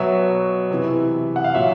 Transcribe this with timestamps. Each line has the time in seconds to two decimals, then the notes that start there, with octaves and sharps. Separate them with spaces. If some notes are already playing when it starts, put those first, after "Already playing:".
Already playing: B2 F#3 E5
0.71 C3 E3
1.36 F#5
1.44 F5
1.54 A#2 F#3 E5